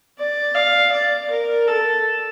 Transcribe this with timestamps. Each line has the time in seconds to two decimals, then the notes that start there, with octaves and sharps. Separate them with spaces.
0.18 D5
0.55 F5
0.92 D5
1.30 A#4
1.67 A4